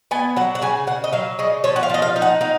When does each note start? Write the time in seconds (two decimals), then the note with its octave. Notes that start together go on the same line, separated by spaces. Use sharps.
0.11 B3 G#5
0.36 F#3 F#5
0.55 F#5
0.62 C#3 G#5
0.87 C#3 F#5
1.04 D#5
1.13 F#3 F5
1.39 C#3 D#5
1.64 F3 C#5
1.76 F#5
1.83 F5
1.90 F3 D#5
2.02 F5
2.16 D#4
2.22 F#5
2.41 D#4 F5